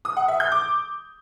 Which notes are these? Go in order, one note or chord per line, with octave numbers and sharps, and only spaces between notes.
D#6
F#5
E5
G6
D6